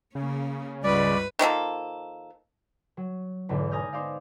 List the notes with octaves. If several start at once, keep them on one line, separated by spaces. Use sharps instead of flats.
C#3 A#3 C#4
C#2 G2 G3 B4 D5
D#3 F3 A#3 A4
F#3
B1 E2 G#2 B2 D3
G#5 A#5 D#6 F6 G6
B3 D#4 C5 D5 F5